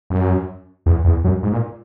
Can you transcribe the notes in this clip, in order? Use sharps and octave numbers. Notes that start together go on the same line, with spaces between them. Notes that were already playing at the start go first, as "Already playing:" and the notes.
F#2
E2
E2
F#2
G#2
A#2